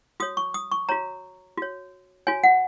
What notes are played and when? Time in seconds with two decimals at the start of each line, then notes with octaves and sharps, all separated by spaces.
0.20 F#4 C#5 D#6
0.37 C#6
0.54 D#6
0.72 C#6
0.89 F#4 C#5 A#5
1.57 F#4 C#5
2.27 F#4 C#5 G#5
2.44 F#5